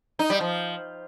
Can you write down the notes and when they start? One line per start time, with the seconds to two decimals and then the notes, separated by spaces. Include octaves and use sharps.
0.19 D#4
0.30 G3
0.41 F3